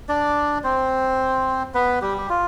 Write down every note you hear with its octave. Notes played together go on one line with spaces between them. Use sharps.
D4 D5
C4 C5
B3 B4
G3 G4
G4
F4